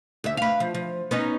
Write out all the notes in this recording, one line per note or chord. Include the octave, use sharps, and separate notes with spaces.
D2 E5
B4 F5
F3
F3
B3 C#4 D#4